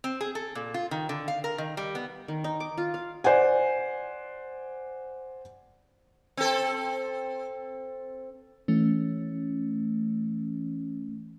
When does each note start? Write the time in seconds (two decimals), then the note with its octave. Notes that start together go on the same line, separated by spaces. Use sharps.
0.04 C4
0.21 G#4
0.35 A4
0.55 A#2
0.74 F4
0.91 D#3
1.09 D3
1.28 F5
1.44 A#4
1.58 D#3
1.77 G3
1.95 B3
2.28 D#3
2.44 D#4
2.60 D6
2.78 F4
2.94 F5
3.24 C5 D5 F#5 G#5
6.37 C4 A4
8.68 E3 A3 C#4